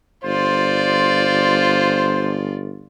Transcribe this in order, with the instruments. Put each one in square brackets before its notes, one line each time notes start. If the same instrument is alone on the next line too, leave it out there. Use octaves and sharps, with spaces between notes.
[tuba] G1 [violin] F4 D5 [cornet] C5